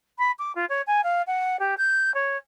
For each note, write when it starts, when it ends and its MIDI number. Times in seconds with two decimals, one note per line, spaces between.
0.18 0.31 83
0.38 0.52 86
0.55 0.65 65
0.69 0.81 73
0.87 1.01 80
1.03 1.22 77
1.27 1.59 78
1.59 1.74 67
1.77 2.13 91
2.14 2.37 73